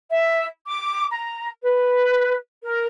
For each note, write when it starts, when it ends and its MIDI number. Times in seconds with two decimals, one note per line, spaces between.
0.10 0.45 76
0.67 1.05 86
1.10 1.47 82
1.62 2.35 71
2.63 2.86 70